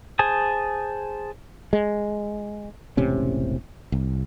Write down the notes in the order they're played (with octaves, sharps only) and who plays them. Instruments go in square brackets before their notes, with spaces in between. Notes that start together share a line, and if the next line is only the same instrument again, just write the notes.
[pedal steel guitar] G#4 C5 G#5 A5 D#6
[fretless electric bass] G#3
E1 A1 C3 C#4
C2